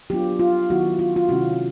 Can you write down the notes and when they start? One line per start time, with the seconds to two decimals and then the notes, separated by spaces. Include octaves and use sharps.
0.10 F#3 B3 D4 F4 G4
0.39 F4
0.70 D#3 F#3 B3 E4 F#4
0.99 F4
1.16 F4
1.29 C3 D#3 G#3 C#4 E4 F#4